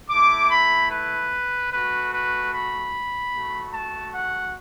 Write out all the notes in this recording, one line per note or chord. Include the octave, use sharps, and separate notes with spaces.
A3 E4 D6
B5
B4
A3 F#4 B4
B4
B5
A3 F#4
A5
F#5